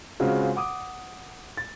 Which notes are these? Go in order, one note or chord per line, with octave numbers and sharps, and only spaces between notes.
C#3 G#3 C4 F4 F#4
F#5 D6 D#6
A6